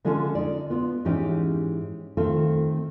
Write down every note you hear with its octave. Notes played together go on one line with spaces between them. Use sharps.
D3 G#3 C#4 F4 A4 A5
D#4 D5
B3 F4
G#2 E3 C#4 D#4 G4
D#3 A3 C4 F4 A4